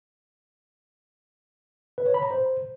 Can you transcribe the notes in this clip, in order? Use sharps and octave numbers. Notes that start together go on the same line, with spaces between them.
B4
C#5
B5
A#5
C5